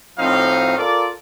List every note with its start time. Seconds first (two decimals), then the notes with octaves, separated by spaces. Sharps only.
0.19 A2 F3 C4 D#4 F#4 F5
0.78 F4 A4 A#4 D5